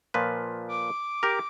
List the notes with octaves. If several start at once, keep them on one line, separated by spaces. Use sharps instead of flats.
A#2 F3 B4
D6
G4 A#4